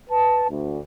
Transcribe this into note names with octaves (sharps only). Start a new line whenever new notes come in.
B4 A5
D2